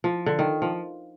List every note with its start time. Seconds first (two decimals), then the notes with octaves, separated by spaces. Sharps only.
0.04 F3
0.26 D3
0.39 D#3
0.62 F3